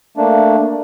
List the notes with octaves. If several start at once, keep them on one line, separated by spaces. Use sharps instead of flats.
A3 A#3 D4